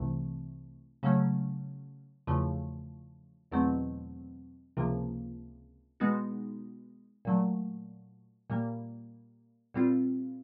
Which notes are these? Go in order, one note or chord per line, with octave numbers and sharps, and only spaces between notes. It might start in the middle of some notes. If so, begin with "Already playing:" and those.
Already playing: C2 C3 E3 A3
C#3 F#3 A3 C#4
E2 C#3 F3 A3
E2 B2 F#3 A3 C4
C#2 C3 F3 A#3
B2 G#3 B3 D#4 F#4
A#2 F#3 A3
A#2 G3 A#3
A#2 G3 C4 F4